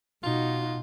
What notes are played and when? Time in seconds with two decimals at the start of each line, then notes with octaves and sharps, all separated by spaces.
0.23 B2 D#4 F4 F#4